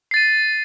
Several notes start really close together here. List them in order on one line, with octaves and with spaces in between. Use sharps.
C7 A6 D#7